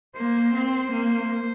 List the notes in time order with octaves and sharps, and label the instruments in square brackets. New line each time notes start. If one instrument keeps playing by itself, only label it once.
[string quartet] A#3 [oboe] C5
[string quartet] C4
A#3